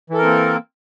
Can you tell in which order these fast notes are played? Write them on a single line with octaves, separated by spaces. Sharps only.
E3 A4 A#4 C4 A#3